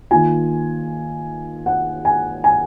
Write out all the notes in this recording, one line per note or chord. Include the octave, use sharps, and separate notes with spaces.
D#3 A#3 F4 G#5
F#5
G#5
G#5